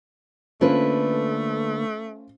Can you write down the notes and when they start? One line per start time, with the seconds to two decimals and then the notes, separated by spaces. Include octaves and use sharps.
0.61 D3 A3 A#3 C#4 F4 B4 C5